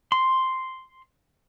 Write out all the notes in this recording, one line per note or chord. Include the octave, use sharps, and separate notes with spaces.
C6